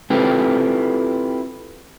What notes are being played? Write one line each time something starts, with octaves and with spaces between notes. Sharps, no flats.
C4 E4 F4 G4 A4 B4